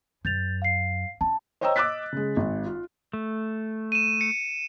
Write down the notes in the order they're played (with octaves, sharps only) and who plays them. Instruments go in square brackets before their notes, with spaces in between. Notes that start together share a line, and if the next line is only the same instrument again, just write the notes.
[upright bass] F#2 [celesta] G6 A6 F7
[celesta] F5 C7
[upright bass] C#4 [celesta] A5
[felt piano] C5 C#5 D#5 G5 A#5 E6
D#5 D6 E6 F#6 A6 B6
C#3 G#3
G#1
F4
[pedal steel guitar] A3
[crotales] D#7 E7
C#7